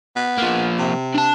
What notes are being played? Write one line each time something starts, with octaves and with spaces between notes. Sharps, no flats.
B3
F3 A#3
C3
D4 A5